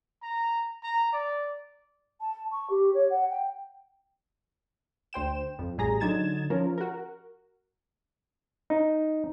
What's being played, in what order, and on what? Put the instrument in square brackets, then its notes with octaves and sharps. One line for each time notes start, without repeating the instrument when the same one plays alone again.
[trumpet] A#5
A#5
D5
[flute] A5
C#6
G4
C#5
F#5
G5
[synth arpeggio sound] D2 C5 G5 E7
F2
A1 G3 G#4 A#5 A#6
D3 F#3 D#4 G#6 A6 E7
F3 C#4 F4 A#4
F#4 A#4
[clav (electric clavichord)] D#4